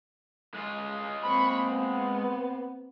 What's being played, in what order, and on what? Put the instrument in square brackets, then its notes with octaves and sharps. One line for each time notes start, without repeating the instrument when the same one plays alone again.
[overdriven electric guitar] G#3 F4
[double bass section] A#3 C4 [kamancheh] B5 C#6
[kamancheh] B3